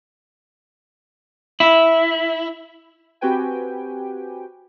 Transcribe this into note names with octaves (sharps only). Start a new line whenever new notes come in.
E4
C4 F#4 G4 B4 G5 G#5